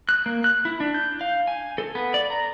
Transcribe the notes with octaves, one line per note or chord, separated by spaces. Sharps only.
F#6
A#3
F#6
E4
D4
G6
F5
G#5
A4
B3
D5
A#5